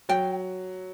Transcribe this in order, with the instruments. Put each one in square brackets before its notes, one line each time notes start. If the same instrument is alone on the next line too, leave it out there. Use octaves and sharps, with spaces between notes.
[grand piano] F#3 [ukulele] G5